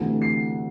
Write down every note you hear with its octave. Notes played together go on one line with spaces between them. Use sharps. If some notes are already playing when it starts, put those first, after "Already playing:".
Already playing: D2 C3 E3 A3
C7